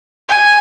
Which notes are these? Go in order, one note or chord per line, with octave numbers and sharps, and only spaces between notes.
G#5